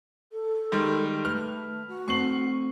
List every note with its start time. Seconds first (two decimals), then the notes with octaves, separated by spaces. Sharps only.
0.32 A4
0.72 D#3 G3 G#3
1.25 A3 B4 F6
1.88 F#4
2.08 A3 C4 C#6 C7 F#7